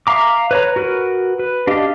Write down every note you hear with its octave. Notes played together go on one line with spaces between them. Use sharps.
E5 F5 A#5 D6
B4 C#5 A#5
F#4 A#4 B4
B4
D4 G4 D#5 F5